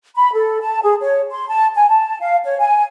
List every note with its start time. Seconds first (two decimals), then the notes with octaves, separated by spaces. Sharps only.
0.16 B5
0.34 A4
0.61 A5
0.83 G#4
1.02 C#5
1.31 C6
1.49 A5
1.75 G#5
1.90 A5
2.20 F5
2.44 C#5
2.59 G#5